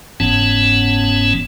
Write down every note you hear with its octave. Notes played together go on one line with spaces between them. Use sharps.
F#1 G#2 E3 B3 C#4 A5